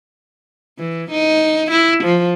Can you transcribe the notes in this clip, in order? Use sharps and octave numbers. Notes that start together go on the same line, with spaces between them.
E3
D#4
E4
F3